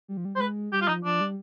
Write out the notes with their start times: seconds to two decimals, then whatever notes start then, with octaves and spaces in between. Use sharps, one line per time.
0.08 G3
0.17 F3
0.25 G3
0.36 G3 C5
0.40 G#3 B4
0.72 G3 G4
0.81 F4
0.88 F3 D#4
1.04 F3 D4
1.21 G3